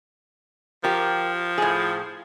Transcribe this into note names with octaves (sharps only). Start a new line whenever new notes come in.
F3 G4 A#4
A2 G#4